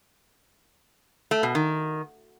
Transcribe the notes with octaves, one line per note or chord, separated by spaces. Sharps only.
A3
B2
D#3